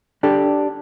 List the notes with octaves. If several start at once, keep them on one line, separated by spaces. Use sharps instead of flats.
D4 G4 A4